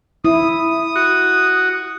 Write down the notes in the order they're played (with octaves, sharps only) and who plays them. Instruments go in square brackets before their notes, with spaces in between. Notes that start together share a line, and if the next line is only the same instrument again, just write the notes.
[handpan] E4 [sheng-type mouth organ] D#6
[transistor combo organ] F#4